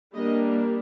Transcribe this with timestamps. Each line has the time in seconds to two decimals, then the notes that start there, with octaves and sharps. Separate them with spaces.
0.13 G3 A#3 D4 D#5